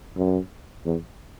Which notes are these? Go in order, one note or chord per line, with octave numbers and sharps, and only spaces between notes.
F#2
E2